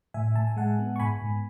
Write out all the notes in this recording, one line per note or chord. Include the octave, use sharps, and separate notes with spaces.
A2 E5 G#5
A2 A5
G#5
G#3 F#5 A5
B3
C#6
G#2 G#5 B5
G#2